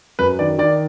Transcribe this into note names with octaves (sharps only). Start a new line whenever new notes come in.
F#2 B4
D#3 D5
D#3 D5